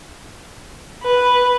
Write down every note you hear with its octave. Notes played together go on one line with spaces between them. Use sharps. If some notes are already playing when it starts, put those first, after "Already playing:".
B4